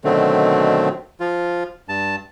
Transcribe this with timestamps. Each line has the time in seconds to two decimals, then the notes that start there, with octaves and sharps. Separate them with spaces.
0.04 B2 D3 D#3 F#3 A3 C4
1.20 F3 F4
1.89 G2 A5